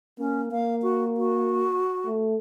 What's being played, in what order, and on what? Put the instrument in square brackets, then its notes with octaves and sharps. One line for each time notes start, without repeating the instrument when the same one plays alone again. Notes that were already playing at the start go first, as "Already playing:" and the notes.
[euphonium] A#3 [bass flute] C#4
[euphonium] A#3 [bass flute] F5
[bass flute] F#4
F#4
[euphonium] A3